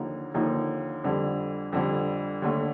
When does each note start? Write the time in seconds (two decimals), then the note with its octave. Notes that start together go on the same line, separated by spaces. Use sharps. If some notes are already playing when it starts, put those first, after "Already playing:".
Already playing: D#2 D3 F3 A#3 D#4
0.34 D#2 D3 F3 A#3 D#4
1.04 F2 D3 G3
1.73 F2 D3 G3
2.42 D#2 D3 A3